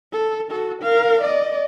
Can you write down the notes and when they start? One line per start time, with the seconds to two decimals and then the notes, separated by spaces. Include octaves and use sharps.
0.13 A4
0.50 F#4 A4
0.82 A#4 F5
1.21 D5 D#5